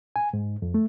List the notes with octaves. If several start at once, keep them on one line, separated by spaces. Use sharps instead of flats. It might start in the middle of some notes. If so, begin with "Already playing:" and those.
G#5
G#2
F2
A3